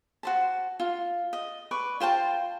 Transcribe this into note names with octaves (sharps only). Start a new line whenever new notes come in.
F#4 C5 A5
F4
D#5
B4 D5 C#6
F4 C5 G5 A5